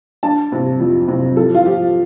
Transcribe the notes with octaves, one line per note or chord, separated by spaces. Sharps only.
D4 A5
C3
F2
C3
F3 A4
F4
F3 G4